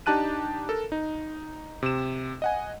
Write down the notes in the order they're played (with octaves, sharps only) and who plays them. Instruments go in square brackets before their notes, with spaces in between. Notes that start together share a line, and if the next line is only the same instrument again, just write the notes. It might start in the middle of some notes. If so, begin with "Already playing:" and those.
[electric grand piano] D4 D#4 G4 A5 F#6 D#7
A4 A#4
D#4
C3 E7
D#5 F#5 G#5